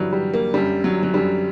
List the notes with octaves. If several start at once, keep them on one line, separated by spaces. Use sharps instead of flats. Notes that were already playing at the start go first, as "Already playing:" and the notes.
Already playing: G2 E3 F#3 G3
G3
A#3
F#2 D3 G3
F#3
F#3
F#2 D3 G3